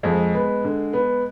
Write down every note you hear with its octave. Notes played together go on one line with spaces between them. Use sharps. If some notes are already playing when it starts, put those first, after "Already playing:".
F2 G#3
B3
D3
B3